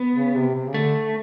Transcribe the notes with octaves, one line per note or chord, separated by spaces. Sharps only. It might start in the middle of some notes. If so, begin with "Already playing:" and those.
Already playing: B3
C#3
C3
C3
C#3
D3 A3